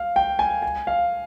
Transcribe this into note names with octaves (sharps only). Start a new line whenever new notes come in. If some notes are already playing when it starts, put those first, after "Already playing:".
Already playing: F5
G5
G#5
G#5
F5